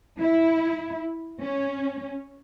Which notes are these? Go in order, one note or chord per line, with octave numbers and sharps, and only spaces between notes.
E4
C#4